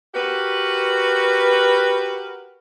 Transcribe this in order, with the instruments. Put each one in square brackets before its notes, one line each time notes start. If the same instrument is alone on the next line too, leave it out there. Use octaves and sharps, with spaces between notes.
[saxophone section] F#4 G4 A#4 B4